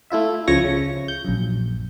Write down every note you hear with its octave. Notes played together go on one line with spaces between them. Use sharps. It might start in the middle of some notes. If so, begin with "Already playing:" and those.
A3 E4 F4 E5
C#2 F3 C#5 C#6 A#6
C#3
G6
A#1 F#2